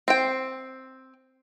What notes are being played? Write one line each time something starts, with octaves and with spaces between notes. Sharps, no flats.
C4 G5